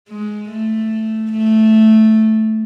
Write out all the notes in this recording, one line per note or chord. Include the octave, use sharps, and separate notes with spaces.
G#3
A3
A3